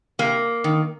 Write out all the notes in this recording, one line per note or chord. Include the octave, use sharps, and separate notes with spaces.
C3 A#3
D#3